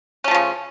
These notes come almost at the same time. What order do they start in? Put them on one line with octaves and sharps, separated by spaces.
C#4 A3 F3 C#3